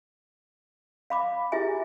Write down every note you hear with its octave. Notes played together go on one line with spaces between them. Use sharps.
F5 B5 D6
E4 F4 G4 G#4 E5 G#5